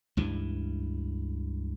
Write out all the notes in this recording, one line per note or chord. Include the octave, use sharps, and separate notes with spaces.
C#2 G2 E3